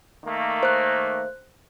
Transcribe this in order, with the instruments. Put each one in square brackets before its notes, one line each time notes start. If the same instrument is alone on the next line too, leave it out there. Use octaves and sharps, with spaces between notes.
[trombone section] D#3 A3 A#3
[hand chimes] C5 F#6